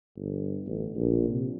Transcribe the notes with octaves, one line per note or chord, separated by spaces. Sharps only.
G1
A1
A#1
C3